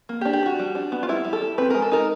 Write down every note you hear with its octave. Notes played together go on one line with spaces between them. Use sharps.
A#3
G4
D4
G4
D4 F#4
G3
D4
B3
F4
G3 E4
G3
A4
G3
C4 B4
G#3 A#4
A4
D#4 A#4